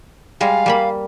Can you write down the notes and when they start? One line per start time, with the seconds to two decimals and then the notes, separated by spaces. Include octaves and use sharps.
0.41 G3 G#3 F5
0.66 G3 A#3 B5